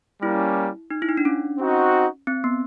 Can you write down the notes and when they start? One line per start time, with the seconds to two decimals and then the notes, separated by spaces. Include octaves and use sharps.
0.22 G3 A#3 C#4 E4
0.90 D#4
1.02 E4
1.09 D#4
1.17 D4
1.25 C#4
1.59 C4 D#4 F#4
2.27 C4
2.44 B3